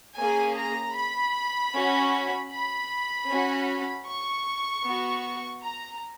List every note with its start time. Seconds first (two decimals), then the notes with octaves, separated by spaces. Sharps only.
0.17 A#3 C#4 G#4 G#5
0.57 A#5
0.95 B5
1.73 C#4 F#4
2.51 B5
3.29 C#4 F#4
4.07 C#6
4.85 B3 F#4
5.63 A#5